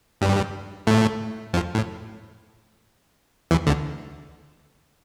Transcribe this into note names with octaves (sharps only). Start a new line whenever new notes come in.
G2 G3
A2 A3
F2 F3
A2
E2 E3
D2 D3